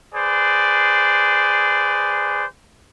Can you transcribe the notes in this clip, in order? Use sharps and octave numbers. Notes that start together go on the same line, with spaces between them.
G#4 B4 C5 D5